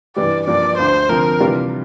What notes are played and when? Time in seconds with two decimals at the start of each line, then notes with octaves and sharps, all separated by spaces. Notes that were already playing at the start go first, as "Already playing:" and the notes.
0.16 G2 E3 G3 D5
0.47 G2 F3 A#3 D4 G4 D5
0.78 D2 D3 A3 C5
1.09 D3 F3 C4 A#4
1.40 C3 E3 G3 D4 F4